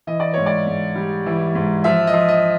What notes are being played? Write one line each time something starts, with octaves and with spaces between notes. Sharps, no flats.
E3 D#5
D5
G#2 C#5
D5
G#2
G3
E3
G#2
F3 E5
D#5
F3
D#5